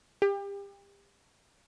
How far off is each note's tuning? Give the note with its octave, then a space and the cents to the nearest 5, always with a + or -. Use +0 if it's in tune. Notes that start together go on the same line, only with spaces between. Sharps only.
G4 +30